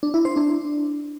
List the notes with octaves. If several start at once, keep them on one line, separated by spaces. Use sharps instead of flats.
D4
E4
C5
D4